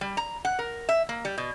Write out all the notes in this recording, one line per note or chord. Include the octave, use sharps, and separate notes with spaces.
G3
A#5
F#5
A#4
E5
A#3
G3
B2